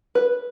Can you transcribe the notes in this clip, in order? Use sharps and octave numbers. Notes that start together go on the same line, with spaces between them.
B4